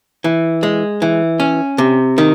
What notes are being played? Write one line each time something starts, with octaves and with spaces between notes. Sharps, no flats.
E3
G#3
E3
C#4
C3
D#3